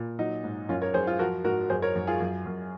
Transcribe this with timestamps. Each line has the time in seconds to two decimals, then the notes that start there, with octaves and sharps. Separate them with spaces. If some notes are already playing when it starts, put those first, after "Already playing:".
Already playing: A#2
0.19 F#3 D#4
0.44 G#2
0.69 F#2 C#4 F4
0.82 A#4 C#5
0.94 F#2 G#4 C5
1.07 F4 G#4
1.19 F3 F#4 A#4
1.44 G#2 F#4 A#4
1.70 F#2 G#4 C5
1.82 A#4 C#5
1.95 F#2
2.07 F4 G#4
2.20 F#2
2.46 F#2